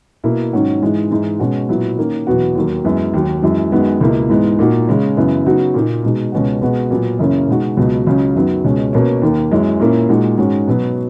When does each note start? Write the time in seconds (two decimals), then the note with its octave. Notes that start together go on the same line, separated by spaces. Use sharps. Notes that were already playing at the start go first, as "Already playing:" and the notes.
0.24 B2 A#3 E4
0.53 G#2 D#3 F#3 C#4 F#4
0.82 G#2 E3 G#3
1.11 G#2 E3 G#3
1.40 B2 G#3 C#4 F#4
1.69 A#2 F#3 B3 E4
1.98 D#3 A#3 C#4
2.27 E2 B2 F#3 B3 F#4
2.55 D#2 D#3 F#3 A#3
2.84 F#2 E3 G#3 B3
3.14 D#2 D#3 F#3
3.42 F#2 E3 G#3
3.72 F#2 D#3 G#3 B3 F#4
4.01 C#2 B2 A#3 E4
4.29 G#2 E3 G#3 B3
4.59 A#2 A#3 D#4 F#4
4.88 C#3 G#3 C#4
5.17 F#2 C#3 E3 B3
5.45 C#3 F#3 B3 D#4 F#4
5.74 A#2 A#3 D#4
6.03 B2 G#3 D#4
6.32 C#2 B2 G#3 C#4 F#4
6.62 B2 G#3 B3 F#4
6.90 A#2 F#3 B3
7.19 F#2 C#3 E3 A#3 C#4
7.48 B2 G#3 D#4 F#4
7.77 C#2 B2 F#3 B3
8.07 C#2 C#3 F#3 C#4
8.35 F#2 D#3 F#3 B3
8.64 C#2 B2 G#3 C#4
8.93 B2 A#3 C#4
9.22 D#2 D#3 A#3
9.51 F#2 E3 G#3 C#4
9.80 A#2 A#3 C#4 E4
10.09 A#2 G#3 D#4 F#4
10.38 G#2 D#3 G#3 C#4 F#4
10.68 B2 F#3 B3